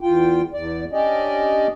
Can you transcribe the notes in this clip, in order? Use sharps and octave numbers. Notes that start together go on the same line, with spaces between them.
E2 F4 G5
E2 D5
C#4 D4 G4 D5 D#5